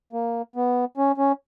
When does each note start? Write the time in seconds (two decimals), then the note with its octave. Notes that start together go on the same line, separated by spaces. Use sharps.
0.13 A#3
0.56 B3
0.97 C#4
1.18 C#4